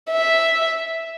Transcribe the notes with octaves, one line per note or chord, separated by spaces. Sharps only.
E5